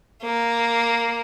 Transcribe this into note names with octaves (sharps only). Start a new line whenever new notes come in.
A#3